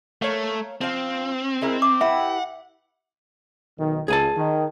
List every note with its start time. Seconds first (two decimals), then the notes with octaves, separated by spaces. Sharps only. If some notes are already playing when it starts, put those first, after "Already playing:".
0.22 A3 A#3 C#5 F5
0.81 F3 C4 F5
1.62 G#3 E4 A#4
1.82 E5 D6
2.01 E4 G4 B4 E5 F#5
3.79 B1 D#3
4.08 C#2 G#4 G#5 A5
4.37 D#3